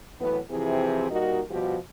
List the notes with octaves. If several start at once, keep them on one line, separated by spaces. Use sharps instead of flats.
A2 E3 F#3 B3
C3 E3 F3 C4 E4 G#4
A#2 G3 D#4 F#4 A#4 D#5
B2 F3 G3 F#4 G4